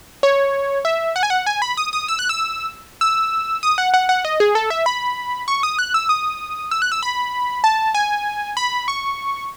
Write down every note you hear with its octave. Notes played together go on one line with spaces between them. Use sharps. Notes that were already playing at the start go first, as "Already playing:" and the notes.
C#5
E5
F#5
G#5
F#5
G#5
B5
D#6
D#6
E6
F#6
E6
E6
D#6
F#5
F#5
F#5
D#5
G#4
A4
E5
B5
C#6
D#6
F#6
E6
D#6
E6
F#6
E6
B5
A5
G#5
B5
C#6